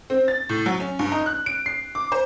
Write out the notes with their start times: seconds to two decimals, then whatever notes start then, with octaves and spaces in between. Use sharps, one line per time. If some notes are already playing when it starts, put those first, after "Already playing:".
0.10 C4
0.28 A6
0.49 A2
0.66 F#3
0.80 C#4
0.99 G2
1.12 D#4
1.26 F#6
1.46 D7
1.66 C7
1.95 D6
2.12 C5